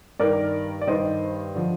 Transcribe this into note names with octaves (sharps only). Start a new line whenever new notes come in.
G2 D#3 A#4 D5
D5
G2 D#3 C5 D#5
D3 F3